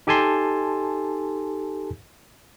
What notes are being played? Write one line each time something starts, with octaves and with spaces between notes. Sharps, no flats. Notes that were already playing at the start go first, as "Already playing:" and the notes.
D#4 G4 A4 G#5 A5 C6